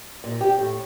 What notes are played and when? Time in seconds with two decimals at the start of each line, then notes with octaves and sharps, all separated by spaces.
0.24 A#2
0.41 G4
0.59 A2